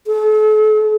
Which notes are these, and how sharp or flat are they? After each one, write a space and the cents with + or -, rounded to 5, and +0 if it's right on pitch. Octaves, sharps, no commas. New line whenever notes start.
A4 -40